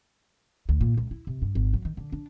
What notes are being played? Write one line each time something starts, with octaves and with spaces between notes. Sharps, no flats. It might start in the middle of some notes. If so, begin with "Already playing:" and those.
D2
A#2
C#2
E4
C3
G2
G#1
F#3
D#3
D3
D4